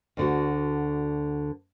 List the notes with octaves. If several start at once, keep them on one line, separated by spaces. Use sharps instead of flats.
D2 D3 F#4